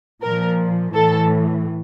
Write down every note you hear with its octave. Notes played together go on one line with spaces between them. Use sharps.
A#2 F3 A#4
A2 E3 A4